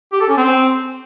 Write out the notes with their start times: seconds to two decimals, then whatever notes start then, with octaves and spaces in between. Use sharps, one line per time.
0.13 G4
0.21 A4
0.29 C#4
0.37 C4